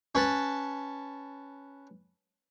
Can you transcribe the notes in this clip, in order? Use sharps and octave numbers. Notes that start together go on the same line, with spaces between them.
C#4 B4 A5